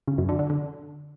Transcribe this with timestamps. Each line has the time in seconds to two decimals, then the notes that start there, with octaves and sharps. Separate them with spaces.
0.08 C#3
0.18 F#2
0.29 D3
0.39 D3
0.50 D3